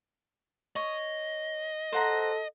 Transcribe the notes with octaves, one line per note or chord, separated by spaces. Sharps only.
C#5 D#5
A4 C5 F#5 A#5